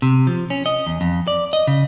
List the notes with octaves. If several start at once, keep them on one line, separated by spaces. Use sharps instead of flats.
C3
F3
C#4
D#5
E2
F2
D5
D#5
C#3